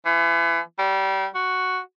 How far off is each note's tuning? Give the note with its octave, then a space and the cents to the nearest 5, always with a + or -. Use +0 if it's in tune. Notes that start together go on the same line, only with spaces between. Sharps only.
E3 +35
G3 -25
F#4 +0